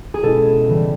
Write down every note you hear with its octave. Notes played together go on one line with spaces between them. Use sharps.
G#4
B2 G#3 C#4 E4 A4
C#3 E3 G3